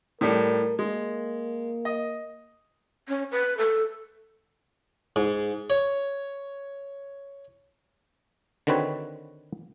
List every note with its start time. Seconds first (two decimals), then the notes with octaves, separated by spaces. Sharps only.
0.21 A2 G3 A#4
0.79 G#3 A#3
1.85 D#5
3.09 C#4
3.31 B4
3.57 A4
5.16 G#2
5.70 C#5
8.67 D3 D#3 C4 F#4 B4 C#5